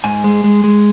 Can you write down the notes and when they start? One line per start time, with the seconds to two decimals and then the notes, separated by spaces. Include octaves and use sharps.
0.04 G#2 G#5
0.24 G#3
0.44 G#3
0.64 G#3